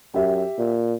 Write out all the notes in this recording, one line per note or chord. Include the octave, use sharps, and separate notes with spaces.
F#2 G4 E5
A#2